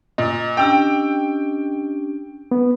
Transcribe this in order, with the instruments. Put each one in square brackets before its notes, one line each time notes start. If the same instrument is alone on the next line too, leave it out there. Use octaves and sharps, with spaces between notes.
[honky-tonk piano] A#2 [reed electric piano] D#5
[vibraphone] C#4 D4 G4 [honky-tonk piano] G5 E6
[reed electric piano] B3